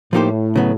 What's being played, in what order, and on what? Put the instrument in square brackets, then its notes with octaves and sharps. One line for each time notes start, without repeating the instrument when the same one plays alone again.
[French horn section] A2 [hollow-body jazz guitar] F3 A#3 D#4 G4 C5
[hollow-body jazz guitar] C#3 F#3 B3